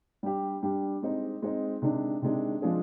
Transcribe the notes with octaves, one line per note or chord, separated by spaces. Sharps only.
G3 D4 G4
G3 D4 G4
G#3 C4 D#4
G#3 C4 D#4
C3 D#3 G#3 D4
C3 D#3 G#3 D4
F3 G#3 D4 F4 G#4